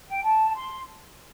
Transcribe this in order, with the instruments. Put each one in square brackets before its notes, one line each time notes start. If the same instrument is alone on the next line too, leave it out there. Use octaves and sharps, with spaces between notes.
[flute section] G5
A5
C6